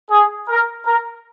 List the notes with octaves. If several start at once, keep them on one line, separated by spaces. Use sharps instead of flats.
G#4
A#4
A#4